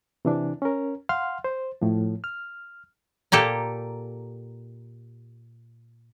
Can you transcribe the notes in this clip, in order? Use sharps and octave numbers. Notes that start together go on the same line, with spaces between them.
C3 E3 D4
C#4 A#4
F5 F#5 C6 F6
C5
A2 F3
F6
A#2 A#3 G4 A4